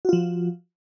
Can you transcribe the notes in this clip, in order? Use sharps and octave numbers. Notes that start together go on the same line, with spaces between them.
F3 F4 F#4